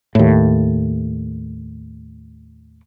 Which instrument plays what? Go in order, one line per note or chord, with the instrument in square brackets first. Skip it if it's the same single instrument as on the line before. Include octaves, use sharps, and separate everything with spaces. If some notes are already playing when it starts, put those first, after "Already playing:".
[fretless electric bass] D#2 A2